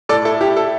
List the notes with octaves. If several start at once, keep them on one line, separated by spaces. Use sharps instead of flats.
A2 A4 D5
E4 A4
E4 G4
E4 A4